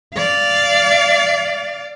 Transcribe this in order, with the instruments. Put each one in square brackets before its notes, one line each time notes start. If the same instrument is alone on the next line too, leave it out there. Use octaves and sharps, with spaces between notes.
[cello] D5 F5